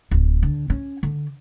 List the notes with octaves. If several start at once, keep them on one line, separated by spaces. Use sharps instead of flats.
D1
D3
C#4
D3